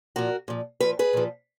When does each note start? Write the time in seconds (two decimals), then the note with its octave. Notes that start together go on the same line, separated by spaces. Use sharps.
0.16 A#2 F3 F#4 A#4
0.48 A#2 F3
0.80 A#2 F3 B4
0.99 G#4 B4
1.13 A#2 F3